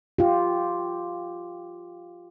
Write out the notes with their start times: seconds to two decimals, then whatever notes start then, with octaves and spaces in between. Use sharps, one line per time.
0.18 F4 G4